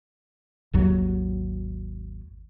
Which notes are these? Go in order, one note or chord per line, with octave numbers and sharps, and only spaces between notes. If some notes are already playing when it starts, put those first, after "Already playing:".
G#1 D#2 F#3